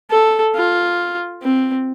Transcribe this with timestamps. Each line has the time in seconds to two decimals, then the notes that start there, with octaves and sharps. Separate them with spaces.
0.11 A4
0.55 F4
1.42 C4